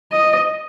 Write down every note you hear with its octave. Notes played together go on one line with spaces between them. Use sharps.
D#5